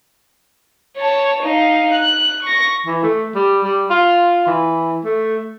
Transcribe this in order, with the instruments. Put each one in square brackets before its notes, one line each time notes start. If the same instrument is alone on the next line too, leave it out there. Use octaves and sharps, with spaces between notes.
[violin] C#5 A5
D#4 F5
F#6
C#6 A#6
[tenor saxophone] E3
A3
G3
G3
F4
E3
A3